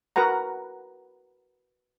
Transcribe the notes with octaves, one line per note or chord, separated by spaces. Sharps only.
F#4 A#4 B4 F#5 A#5